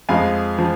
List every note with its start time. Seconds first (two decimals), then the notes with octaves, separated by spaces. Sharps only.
0.09 F2 F3 G#3 F5 G#5
0.59 F3